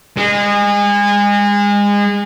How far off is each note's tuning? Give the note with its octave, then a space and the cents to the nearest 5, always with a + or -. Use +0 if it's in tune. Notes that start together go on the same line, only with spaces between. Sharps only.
G#3 -30